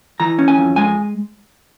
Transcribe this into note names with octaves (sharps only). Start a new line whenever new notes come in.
E3 A#5
C#4
G#5
F2
G#3 G#5